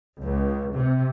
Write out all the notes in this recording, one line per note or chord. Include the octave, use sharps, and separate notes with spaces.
C#2
C3